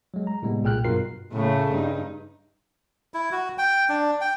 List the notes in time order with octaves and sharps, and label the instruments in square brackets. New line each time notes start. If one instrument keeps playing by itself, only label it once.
[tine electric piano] F#3 G#3
A#5
A2 C3 G3 G#3 B3
B1 A#2 G#4 G5 F6 F#6
G2 B2 F#3 F4 A#4 C7
[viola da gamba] A2 C#3 A3
G2 D#4
[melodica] E4
F#4
G5
D4
G5